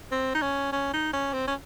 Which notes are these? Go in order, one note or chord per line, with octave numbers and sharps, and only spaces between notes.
C4
D#4
C#4
C#4
D#4
C#4
C4
C#4